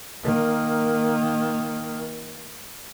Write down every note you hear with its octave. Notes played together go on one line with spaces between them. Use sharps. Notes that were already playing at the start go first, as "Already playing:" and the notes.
D#3 A#3